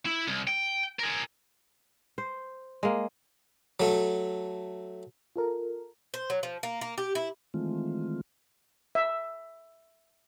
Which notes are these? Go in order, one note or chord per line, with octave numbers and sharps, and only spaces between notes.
E4
C2
G5
G#4 A#4
C5
G#3 A#3
F#3 A3
F4 A4 A#4
C5
F#3
F3
A#3
A#3
G4
E4
D#3 E3 G#3 A3 C4 F4
E5